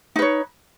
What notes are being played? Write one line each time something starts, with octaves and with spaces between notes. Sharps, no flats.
D#4 B4 C#5